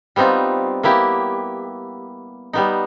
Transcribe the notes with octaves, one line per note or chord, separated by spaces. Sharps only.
G3 B3 C4 D#4 F4
A#3 B3 E4 G4
G3 B3 D#4